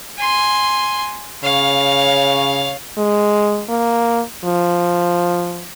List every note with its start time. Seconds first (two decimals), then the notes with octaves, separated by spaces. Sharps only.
0.18 G#5 C6
1.44 C#3 C#5 F5
2.98 G#3
3.69 A#3
4.44 F3